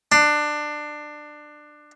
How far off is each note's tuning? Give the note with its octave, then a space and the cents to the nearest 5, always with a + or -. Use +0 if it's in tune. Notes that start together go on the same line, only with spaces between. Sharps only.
D4 +20